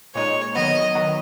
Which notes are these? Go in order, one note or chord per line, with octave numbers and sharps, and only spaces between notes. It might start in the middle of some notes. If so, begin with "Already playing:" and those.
A#2 G#3 D#4 C#5
D#3 F#3 B3 D#5
D#3 F#3 B3